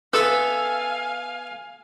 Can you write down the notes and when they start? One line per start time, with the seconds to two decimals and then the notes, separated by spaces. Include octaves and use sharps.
0.13 B3 A4 E5 F5 G#5 E6